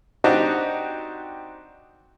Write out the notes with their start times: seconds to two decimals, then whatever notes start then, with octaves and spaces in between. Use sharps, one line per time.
0.24 C4 D4 D#4 F#4 G4